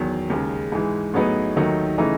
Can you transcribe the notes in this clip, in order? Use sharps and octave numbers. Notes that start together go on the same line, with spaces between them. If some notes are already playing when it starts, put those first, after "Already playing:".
Already playing: E2 D#3 F#3
D#2 C#3 G#3
G#2 E3 G#3
A2 F#3 B3 D#4 G#4
D#2 D#3 F#3 A3 D#4
C#3 E3 A3 D#4